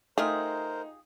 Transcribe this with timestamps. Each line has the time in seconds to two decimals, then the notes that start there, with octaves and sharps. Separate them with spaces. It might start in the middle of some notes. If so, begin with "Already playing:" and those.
0.18 A3 D#4 F4 G4 G#4 A#4 C5